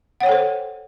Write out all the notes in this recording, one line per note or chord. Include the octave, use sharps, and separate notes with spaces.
A4 C5 C#5 F#5 G5